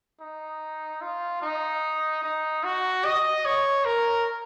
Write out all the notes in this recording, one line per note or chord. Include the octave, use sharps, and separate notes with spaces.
D#4
F4
D#4
D#4
F#4
D#5
C#5
A#4